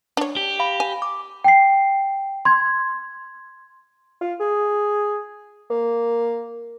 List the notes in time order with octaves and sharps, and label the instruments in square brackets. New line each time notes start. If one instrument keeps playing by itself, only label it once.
[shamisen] D4 C#5
[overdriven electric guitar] G4
[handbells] F5 B5
[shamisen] G#5
[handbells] D6
[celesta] G5 C7
C6 G#6
[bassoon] F4
G#4
A#3